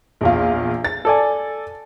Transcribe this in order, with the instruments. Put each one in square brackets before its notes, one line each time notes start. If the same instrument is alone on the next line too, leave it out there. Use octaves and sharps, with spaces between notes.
[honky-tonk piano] A#1 E2 F4
A6
[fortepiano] A4 D5 G#5